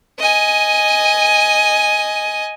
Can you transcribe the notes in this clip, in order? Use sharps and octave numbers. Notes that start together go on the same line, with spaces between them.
D#5 G#5